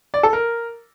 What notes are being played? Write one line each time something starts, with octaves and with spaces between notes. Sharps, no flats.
D5
A4
A#4